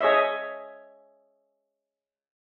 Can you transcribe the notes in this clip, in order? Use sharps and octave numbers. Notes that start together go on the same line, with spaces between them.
G#4 C#5 D#5 E5